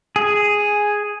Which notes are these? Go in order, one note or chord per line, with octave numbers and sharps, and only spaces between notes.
G#4